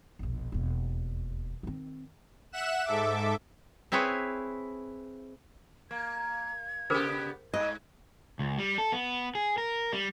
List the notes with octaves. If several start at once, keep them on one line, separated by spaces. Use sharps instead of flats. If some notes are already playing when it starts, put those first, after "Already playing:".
E1 A#1
E1 D#2
D#3 C4
E5 F#5 F#6 E7
G#2 A4 E5 D6
C4 E4 G#4 B4 C#5
A#3 G#6
C#3 B3 G4 G#4 A#4 C5
G#2 D#5 G#6
C#2
G3
A4
B3
G#4
A#4
G3